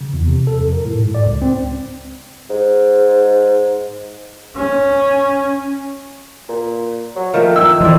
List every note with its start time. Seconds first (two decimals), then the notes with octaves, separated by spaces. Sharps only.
0.01 C#3
0.14 E2
0.27 C3
0.47 A4
0.59 F2
0.73 A#4
0.85 A2
1.01 G#2
1.15 D5
1.26 C#2
1.42 C4
2.50 G#2
4.56 C#4
6.49 A#2
7.16 F#3
7.34 D#3 F3 A3 A#3
7.56 D#4 E6
7.81 A2 E3 C4 D5